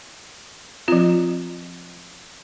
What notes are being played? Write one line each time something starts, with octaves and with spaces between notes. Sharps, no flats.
F3 C4 F4